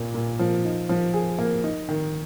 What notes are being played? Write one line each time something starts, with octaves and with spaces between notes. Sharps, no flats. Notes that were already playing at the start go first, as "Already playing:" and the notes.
Already playing: A#2 A#3
A#2
F3
D#4
F3
G#4
A#3
D#4
D#3